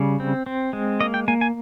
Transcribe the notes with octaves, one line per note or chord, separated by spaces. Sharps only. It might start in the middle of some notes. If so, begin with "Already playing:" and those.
Already playing: C#3 G3
C4
C4
G#3
A#3 D#5
G5
A#3 G#5
G#5